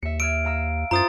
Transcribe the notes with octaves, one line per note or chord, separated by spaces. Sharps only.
D#2 E5 C#7
E6 F6 G#6 D7
F5 A#5 E6
F#2 F4 C5 A#5 D#6 A6